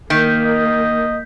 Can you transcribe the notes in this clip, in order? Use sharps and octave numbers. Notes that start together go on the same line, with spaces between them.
D#3 A#3 G6 B6
D#5